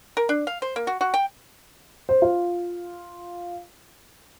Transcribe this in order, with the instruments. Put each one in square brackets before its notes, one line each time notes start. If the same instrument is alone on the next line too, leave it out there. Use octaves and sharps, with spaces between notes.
[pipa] A#4
D4
F5
C5
A#3
F#4
F#4
G5
[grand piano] C5
F4